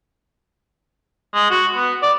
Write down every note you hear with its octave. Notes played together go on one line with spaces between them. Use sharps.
G#3
F#4
B3
D5